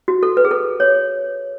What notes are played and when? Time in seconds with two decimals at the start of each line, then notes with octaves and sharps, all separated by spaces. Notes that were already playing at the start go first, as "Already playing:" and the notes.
0.08 F#4
0.23 A4
0.37 B4
0.45 G#4
0.51 A4
0.80 C#5